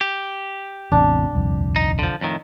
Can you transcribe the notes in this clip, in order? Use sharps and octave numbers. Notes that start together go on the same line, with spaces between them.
G4
A1 E2 C3 D4
D#1 C2 F2
D#4
D3 F3
F2 A2 D#3